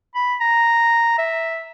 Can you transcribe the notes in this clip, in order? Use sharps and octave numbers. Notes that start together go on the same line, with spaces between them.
B5
A#5
E5